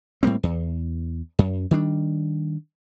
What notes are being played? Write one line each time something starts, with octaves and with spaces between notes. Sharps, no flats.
A2 G3 A#3 C4
E2
F#2
D#3 G3 D4